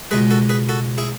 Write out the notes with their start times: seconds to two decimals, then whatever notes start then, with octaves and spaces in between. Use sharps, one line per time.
0.11 C#2 B2 G#3 G#4 B4
0.31 F#4 A4
0.49 G#4 B4
0.69 F#4 A4
0.98 E4 G#4